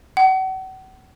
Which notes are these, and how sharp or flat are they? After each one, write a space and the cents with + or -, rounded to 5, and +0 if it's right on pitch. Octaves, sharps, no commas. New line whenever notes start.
F#5 +40